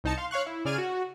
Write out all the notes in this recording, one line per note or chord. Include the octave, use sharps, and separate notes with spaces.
C2 D#4 A5 C#7
F5 C6
C#5 F5 C#6 F#6
E4
C#3 G#4 D5 F6 G#6 D#7
F#4